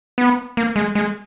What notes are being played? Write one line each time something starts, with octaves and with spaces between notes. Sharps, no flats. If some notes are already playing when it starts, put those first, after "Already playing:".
B3
A#3
G#3
G#3